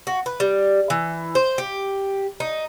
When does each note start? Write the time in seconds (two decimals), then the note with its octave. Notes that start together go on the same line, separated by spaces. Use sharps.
0.07 F#4
0.26 B4
0.40 G3
0.90 E3
1.35 C5
1.58 G4
2.40 D#4